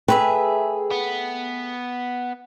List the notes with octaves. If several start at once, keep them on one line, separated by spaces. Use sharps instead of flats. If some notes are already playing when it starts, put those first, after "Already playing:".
A3 G#4 B4 E5 G5
B3